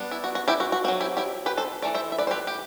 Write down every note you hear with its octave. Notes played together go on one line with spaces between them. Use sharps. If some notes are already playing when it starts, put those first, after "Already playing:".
Already playing: G3 B3 D4
E4
F#4
F#4
E4 G4
F#4
F#4
F#3 C4 F#4
E4 G4
E4 G4
G4 B4
A4 C5
E3 A3 D5
C5 E5
E5
B4 D5
C5
G4 B4
G4